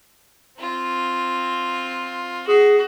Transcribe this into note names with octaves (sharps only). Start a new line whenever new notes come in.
C4 F4
F#4 G#4